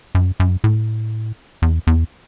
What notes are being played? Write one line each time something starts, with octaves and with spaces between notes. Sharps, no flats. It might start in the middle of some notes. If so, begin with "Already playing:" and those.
F#2
F#2
A2
E2
E2